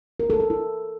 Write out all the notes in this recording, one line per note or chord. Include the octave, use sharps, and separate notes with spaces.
A#4
A4
A4
E4